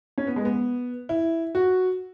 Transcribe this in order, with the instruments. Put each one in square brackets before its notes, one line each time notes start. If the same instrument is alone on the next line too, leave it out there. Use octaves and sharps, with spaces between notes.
[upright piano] C#4
B3
G#3
B3
E4
F#4